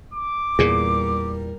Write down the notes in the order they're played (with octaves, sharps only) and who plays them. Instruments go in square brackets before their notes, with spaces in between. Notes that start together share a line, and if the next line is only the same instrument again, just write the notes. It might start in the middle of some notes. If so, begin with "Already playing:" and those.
[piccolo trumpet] D6
[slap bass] E2 A#2 [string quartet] G3 A#4 [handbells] G#4